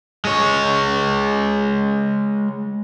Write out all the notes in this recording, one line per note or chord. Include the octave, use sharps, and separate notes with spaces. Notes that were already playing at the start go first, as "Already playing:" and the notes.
G#3 C#5